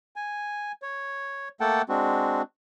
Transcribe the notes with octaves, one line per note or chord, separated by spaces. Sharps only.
G#5
C#5
A3 A#3 A4 F#5 G5 A5
G#3 C4 D4 F#4